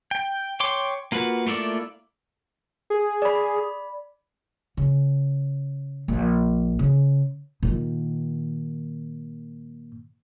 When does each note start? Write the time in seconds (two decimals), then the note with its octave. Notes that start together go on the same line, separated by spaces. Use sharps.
0.11 G5
0.60 C#5 G5 C6 D6
1.12 A#3 F4 F#4 B4
1.47 A3 A#3 E4 F4 D5
2.90 G#4
3.22 D5 B5
4.77 C#3
6.08 A#1
6.79 C#3
7.63 A#2 D#3